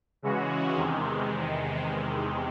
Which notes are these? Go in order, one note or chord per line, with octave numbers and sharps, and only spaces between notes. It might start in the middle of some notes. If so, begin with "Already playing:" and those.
C#3 E3 G#3 C#4 F#4
E2 C3 D#3 G#3